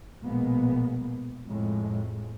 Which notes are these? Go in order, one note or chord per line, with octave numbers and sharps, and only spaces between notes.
A#1 B2 G#3 A#3 B3
F2 A2 G#3